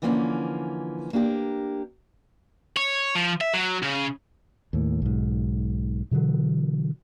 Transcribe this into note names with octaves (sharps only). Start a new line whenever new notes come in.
D3 E3 F3 A#3 C4 C#4
A#3 D4 G4 A#4
C#5
F3
E5
F#3
C#3
D#2 A2
B1 G#2
B2 D3 E3 F#3